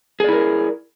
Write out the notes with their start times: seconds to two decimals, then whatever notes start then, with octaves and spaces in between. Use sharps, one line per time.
0.20 G#4
0.24 D5
0.29 E4
0.33 A#4